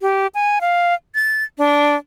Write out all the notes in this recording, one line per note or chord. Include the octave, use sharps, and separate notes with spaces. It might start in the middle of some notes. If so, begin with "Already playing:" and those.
G4
G#5
F5
A6
D4